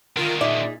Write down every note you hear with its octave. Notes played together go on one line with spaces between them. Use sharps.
D3 D#3 F4 A#4
A#2 D#4 G#4 D5 E5